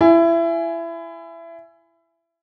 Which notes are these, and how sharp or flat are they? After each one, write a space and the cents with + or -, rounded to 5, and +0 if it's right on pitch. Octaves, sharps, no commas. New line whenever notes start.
E4 +25 G#5 +0